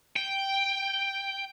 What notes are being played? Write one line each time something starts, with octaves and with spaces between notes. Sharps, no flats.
G5